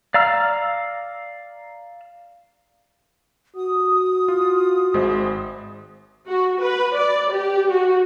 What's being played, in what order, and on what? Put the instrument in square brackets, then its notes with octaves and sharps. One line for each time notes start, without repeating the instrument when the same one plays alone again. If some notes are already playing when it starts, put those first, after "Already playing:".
[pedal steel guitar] D5 F5 A#5 E6 F6
[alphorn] F#4 [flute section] D#6
[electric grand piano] F4
G#1 G#3 C5
[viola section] F#4
B4
D5
G4
F#4